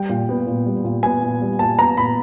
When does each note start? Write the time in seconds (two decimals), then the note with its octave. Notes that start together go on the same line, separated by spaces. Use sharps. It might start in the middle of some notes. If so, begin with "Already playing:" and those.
Already playing: G3 G5
0.09 A#2
0.29 B3
0.47 A#2
0.66 G3
0.84 A#2
1.03 B3 G#5
1.23 A#2
1.42 G3
1.59 A#2 A5
1.79 B3 A#5
1.97 A#2 B5